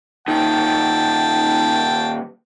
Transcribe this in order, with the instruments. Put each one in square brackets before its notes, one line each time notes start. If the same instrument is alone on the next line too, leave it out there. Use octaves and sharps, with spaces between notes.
[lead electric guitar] A#2 D#3 [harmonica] G5 A5